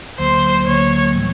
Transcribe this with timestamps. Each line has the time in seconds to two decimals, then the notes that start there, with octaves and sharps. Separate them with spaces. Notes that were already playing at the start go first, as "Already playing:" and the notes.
0.19 D2 D3 F#3 A#3 C5
0.67 D2 D3 F#3 A#3 C#5
1.16 A2 E3 G3 B3